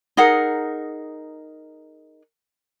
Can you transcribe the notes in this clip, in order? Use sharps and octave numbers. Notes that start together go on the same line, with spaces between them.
D#4 G#4 A#4 F#5